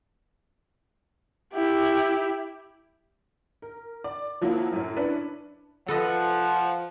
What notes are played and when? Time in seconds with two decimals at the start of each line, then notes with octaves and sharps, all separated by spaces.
1.54 E4 G4
3.62 A#4
4.04 D5
4.41 F3 F#3 A#3 E4
4.72 F#2 A2 F#3
4.96 C#4 D4 E4 B4
5.88 F3 A4 B4 D#5 F#5